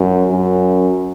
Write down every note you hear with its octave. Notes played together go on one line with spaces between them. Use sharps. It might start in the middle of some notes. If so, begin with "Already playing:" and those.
Already playing: F#2
F#2